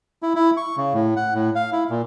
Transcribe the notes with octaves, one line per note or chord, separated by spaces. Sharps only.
E4
E4
C#6
C#3
A2
F#5
A2
F5
E4
A#2